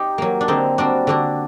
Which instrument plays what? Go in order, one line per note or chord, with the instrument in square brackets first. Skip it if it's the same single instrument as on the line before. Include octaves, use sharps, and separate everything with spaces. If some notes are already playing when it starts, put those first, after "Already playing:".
Already playing: [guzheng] D#4 G4
F#3 A#3
D4
D3 C4 D#4
G3 C4 D4 F#4
D3 D4 F#4